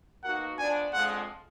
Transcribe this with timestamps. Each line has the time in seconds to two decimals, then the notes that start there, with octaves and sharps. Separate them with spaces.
0.24 B2 A#3 D#4 F#4 A#4 F#5
0.58 F3 B3 D4 G#5
0.93 F2 D3 F3 G#3 F#5